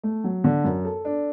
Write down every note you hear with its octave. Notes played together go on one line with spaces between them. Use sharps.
A3
F#3
D3
F#2
A4
D4